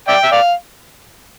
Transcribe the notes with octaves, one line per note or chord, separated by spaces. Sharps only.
D5 E5 G5
E5
D5 F5